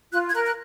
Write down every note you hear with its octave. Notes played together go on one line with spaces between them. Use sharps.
F4 F#6
G#6
A#4 F#6
F#6